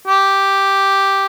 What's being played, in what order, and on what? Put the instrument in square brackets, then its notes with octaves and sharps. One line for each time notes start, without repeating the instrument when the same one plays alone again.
[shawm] G4